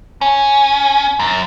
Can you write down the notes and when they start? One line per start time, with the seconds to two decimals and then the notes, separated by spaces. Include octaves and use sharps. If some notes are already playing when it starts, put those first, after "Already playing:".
0.21 C#4
1.20 F#2